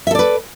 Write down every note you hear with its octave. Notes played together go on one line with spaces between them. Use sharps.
A4 B4 D5 E5